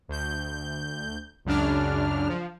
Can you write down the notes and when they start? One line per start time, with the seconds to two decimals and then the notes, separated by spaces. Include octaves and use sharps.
0.08 D2 G6
1.45 C#2 F#2 C#3 D4 F6
2.28 F3